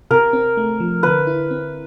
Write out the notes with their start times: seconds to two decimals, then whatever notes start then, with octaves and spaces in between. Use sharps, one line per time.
0.11 C3 A#4
0.33 C4
0.57 A3
0.80 F3
1.03 D3 B4
1.27 E4
1.51 C4